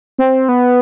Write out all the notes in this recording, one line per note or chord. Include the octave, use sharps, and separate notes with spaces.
C4
B3